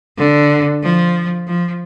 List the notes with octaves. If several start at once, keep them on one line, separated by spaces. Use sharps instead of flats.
D3
F3
F3